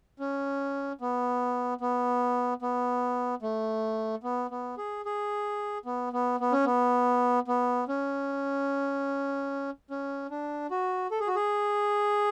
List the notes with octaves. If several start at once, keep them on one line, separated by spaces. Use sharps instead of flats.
C#4
B3
B3
B3
A3
B3
B3
G#4
G#4
B3
B3
B3
C#4
B3
B3
C#4
C#4
D4
F#4
A4
G#4
F#4
G#4